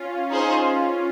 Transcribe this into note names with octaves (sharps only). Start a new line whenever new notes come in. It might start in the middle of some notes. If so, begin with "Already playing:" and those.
Already playing: C#4 F4
D#4 G#4 C5